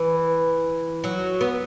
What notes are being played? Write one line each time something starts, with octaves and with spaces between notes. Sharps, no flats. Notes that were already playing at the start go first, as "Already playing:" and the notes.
Already playing: E3
F#3
B3